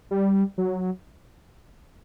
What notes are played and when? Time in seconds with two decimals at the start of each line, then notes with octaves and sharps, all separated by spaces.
0.11 G3
0.58 F#3